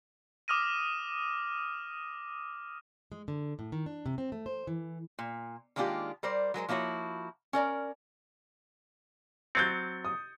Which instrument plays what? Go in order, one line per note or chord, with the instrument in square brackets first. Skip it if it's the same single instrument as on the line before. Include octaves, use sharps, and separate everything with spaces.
[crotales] D6 D#6 F6 A#6 D#7
[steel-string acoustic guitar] G#3
D3
A2
D#3
D4
C3
C4
A3
C5
E3
[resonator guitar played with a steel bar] A#2
D#3 G#3 A#3 D4 F4 G4
G3 A#4 C5 D5
F#3 G#3 A#4 C5
F3 A#3 E4 F#4 C#5
C#4 A#4 D5 A#5
[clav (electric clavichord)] F#3 C4 [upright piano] G6 A6 C#7
[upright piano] D#6